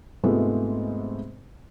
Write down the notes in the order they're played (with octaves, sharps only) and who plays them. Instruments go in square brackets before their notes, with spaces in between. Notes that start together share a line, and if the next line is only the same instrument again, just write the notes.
[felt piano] G#2 C3 G#3 A3 B3 F4